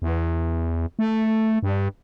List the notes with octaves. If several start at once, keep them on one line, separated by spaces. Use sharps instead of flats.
E2
A3
G2